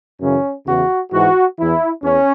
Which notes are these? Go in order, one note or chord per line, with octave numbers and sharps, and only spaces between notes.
F#2 C#3 E3 C#4
E2 C#3 E3 F#4
G#2 E3 F#4
E2 E3 E4
E2 C#4